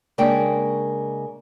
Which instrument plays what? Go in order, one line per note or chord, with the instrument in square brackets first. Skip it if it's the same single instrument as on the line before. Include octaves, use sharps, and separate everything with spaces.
[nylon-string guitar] C#3 G#3 A#3 D4 G5